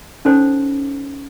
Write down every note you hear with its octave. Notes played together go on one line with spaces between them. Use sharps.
C#4 D#4 A4 C5 C#5